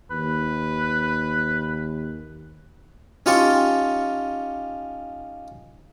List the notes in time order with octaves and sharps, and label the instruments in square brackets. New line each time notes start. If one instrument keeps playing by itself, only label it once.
[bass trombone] D#2 [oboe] B4
[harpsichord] C#4 D#4 F4 G4 A5 C#6